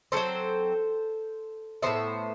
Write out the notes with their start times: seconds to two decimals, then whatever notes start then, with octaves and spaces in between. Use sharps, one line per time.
0.12 D3 F#3 C4 A4 C5
1.82 F#3 B3 C5 E5
1.87 A2